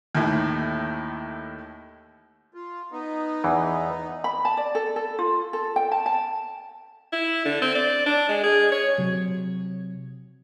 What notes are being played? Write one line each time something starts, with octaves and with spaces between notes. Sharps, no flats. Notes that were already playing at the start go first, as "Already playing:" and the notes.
D#2 A2
F4
B3 D#4
E2 E3
B5
A5
D5
A4
A4
F4
A4
G5
A5
A5
E4
D3
C4
D5
D4
G#3
G#4
C#5
C3 F#3